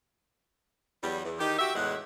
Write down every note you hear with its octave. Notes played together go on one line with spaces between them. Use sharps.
E2 F#3 G3
E2
D#3 D#4 G4
F#4 G4 E5
E2 A2 G#3 B4 F#5